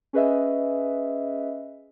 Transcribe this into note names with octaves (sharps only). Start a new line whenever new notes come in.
C#4 G#4 B4 D#5 E5